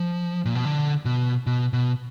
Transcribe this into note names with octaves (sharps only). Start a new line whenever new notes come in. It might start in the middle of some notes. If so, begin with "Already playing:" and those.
Already playing: F3
A#2
B2
D3
B2
B2
B2